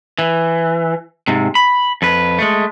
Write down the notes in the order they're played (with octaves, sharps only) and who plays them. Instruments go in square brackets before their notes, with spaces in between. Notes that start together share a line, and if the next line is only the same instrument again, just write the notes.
[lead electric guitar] E3
G#2 C3
B5
F2 B4
G#3 A3